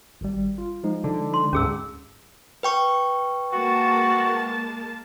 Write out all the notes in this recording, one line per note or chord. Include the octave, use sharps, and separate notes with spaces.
G#1 G3
F4
F3 G#3 D#4
D3
C6
D2 G#2 C#4 G#4 E6
B4 G5 C#6
G#3 A#3 F#4 A5